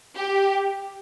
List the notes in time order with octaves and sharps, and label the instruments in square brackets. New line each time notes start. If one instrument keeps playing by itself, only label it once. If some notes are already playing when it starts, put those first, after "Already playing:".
[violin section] G4